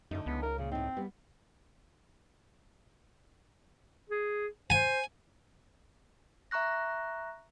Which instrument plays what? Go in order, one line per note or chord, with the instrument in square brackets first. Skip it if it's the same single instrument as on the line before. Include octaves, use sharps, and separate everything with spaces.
[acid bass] F#2 [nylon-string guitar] D3 A3 D#4
[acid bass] C#2 [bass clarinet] B3
[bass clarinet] A#4
[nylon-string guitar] A#2 [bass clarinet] C#3
[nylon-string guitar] A2 D#4 [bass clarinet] C4
[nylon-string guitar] G3 B3
[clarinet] G#4
[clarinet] C5 [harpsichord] G#5
[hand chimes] E5 A#5 C#6 F#6 A#6